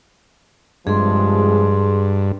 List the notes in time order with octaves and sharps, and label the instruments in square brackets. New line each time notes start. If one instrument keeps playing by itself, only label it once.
[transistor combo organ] G2 [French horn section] C3 F3 G#3 [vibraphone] G#4 C6